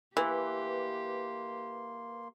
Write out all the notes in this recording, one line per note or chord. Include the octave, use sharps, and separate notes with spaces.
E3 A#3 G4 B4 C6